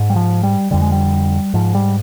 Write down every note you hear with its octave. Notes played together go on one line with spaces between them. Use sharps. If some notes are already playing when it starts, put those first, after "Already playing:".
Already playing: G#2
G3
F3
G3
F2 D3 G3
G#3
G3
G#2 F3
G3